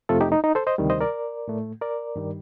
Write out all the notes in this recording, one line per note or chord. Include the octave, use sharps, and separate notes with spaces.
F2 C3 F3 A3 F4 A4
D#4 G4
D#4
D#4
A4 C5
C5 D#5
D2 C3 D#3 G3
C5 D#5
A#4 D5
A2 A3
A#4 D5
G2 D#3 G3